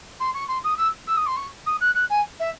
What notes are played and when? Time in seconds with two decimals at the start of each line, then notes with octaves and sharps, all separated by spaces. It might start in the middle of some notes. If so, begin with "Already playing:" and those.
0.20 C6
0.34 C#6
0.48 C6
0.63 D#6
0.77 E6
1.07 E6
1.16 D#6
1.26 C6
1.36 C#6
1.66 D#6
1.80 F#6
1.94 F#6
2.10 G#5
2.39 E5